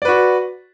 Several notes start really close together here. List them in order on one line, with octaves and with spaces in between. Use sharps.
D5 B4 F#4